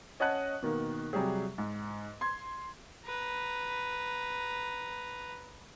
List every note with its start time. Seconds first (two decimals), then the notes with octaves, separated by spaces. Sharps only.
0.20 C#4 D#5 F#5 A5 F#6
0.62 B2 D#3 A#3
1.13 C3 F#3 G3 G4 G#4
1.58 G#2
2.21 C6 G#6
3.05 B4 A#5